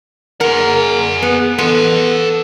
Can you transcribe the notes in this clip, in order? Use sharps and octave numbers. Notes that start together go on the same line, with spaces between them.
G#4 A#4 F#5
B3
B3 A4 C6